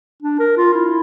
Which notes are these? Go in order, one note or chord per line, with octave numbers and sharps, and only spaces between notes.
D4
A#4
F4
E4